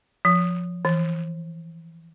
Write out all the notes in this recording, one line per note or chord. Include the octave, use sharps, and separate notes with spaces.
F3
E3